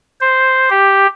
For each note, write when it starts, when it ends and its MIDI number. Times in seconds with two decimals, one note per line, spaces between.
0.21 0.69 72
0.70 1.07 67